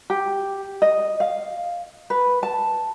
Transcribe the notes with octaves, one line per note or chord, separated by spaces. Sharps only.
G4
D#5
F5
B4
A5